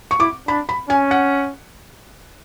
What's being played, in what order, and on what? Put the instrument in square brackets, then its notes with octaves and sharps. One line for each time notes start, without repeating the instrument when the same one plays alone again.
[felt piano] C#6
[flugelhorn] E4 [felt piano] D6
[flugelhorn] D4 [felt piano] B5
[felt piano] B5
[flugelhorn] C#4 [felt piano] G#5
[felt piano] F#5